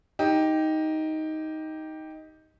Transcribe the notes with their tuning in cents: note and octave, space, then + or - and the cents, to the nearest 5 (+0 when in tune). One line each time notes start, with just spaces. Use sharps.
D#4 +10 G4 +0